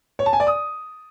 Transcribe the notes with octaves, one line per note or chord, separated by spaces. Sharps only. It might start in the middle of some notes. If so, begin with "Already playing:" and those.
C#5
A5
G#5
D5
D#6